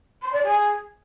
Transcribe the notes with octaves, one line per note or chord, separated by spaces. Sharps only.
C6
D5
G#4